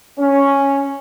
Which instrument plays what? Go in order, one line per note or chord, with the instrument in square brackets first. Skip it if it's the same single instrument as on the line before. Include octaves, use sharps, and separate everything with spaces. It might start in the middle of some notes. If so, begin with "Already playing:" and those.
[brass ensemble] C#4